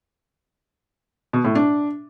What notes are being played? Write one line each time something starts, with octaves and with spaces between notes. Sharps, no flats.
B2
A2
D4